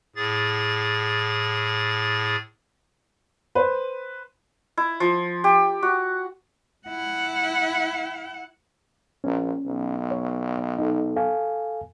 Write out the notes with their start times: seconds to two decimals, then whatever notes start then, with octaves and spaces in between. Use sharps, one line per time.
0.16 A2 G#4 A6
3.55 B4 C5
4.78 E4
5.00 F3
5.44 G4
5.83 F#4
6.88 E4 F#5
9.24 A#1 C#4
9.66 B1
10.11 C#5
10.78 D#4 A4
11.16 A4 F5 G#5